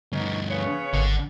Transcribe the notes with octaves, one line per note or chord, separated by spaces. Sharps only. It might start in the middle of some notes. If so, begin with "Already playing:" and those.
D2 G2 B3 C#4 D#4
C#3 B3 C#5
G#1 D3